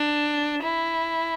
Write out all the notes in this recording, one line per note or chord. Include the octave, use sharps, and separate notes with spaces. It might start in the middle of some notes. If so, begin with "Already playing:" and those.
Already playing: D4
E4